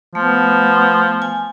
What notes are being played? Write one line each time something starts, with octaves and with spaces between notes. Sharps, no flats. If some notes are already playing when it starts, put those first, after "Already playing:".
F3 A3 B3
G#5